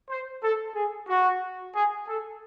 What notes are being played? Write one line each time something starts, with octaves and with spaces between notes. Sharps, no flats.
C5
A4
G#4
F#4
G#4
A4